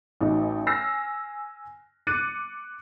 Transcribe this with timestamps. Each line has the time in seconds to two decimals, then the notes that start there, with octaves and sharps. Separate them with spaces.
0.21 A1 D#4 F#4
0.66 G#5 E6 F6 A#6 C7
2.07 D6 F#6 A6 C#7 D#7